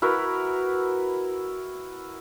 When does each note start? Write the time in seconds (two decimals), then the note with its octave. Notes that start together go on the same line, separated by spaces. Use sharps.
0.02 E4 F#4 A#4 B4